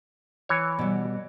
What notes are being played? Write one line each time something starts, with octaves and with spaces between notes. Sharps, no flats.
E3 C#5
B2 G3